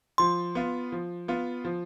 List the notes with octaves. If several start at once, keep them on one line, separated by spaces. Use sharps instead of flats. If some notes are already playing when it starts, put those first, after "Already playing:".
F3 C6
B3 F4
F3
B3 F4
F3